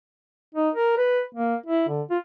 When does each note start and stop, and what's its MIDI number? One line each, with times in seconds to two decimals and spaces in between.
0.55 0.70 63
0.75 0.93 70
0.98 1.22 71
1.34 1.56 58
1.66 1.88 64
1.88 2.02 50
2.10 2.18 65